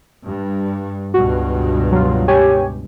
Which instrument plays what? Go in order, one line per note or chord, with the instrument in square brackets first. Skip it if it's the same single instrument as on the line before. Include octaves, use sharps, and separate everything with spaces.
[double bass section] G2
[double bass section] C#2 G2 B2 [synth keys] F#4
[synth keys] F#3 F4
G4 C#5 G#5